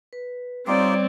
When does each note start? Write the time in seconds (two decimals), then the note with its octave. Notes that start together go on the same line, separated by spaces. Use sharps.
0.13 B4
0.67 G3 C4 D#4 F4 G4 C#5 D5